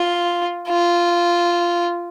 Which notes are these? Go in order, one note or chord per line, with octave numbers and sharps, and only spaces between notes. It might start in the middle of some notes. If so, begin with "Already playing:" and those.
Already playing: F4
F4